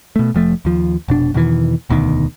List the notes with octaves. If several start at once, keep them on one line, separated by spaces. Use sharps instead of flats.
B2 A3
F1 F3 A3
D#2 F3
F1 B2 D4
E2 B2 D#3 E3
E1 D2 B2 D#3